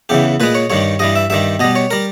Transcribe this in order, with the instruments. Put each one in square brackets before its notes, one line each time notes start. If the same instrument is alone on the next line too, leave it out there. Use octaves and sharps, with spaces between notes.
[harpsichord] E2 C#3 E3 G4
A#2 G#3 B4
C#5
G2 D#3 G3 C#5
G2 E3 G3 D#5
E5
G2 D#3 G3 E5
B2 G3 D#5
C#5
G3 A#4